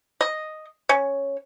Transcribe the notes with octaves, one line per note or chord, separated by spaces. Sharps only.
D#5
C#4